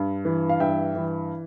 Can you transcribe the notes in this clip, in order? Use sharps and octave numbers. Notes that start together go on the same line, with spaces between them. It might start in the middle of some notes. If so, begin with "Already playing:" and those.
Already playing: G2
E3
F5
G2 E5 G5
E3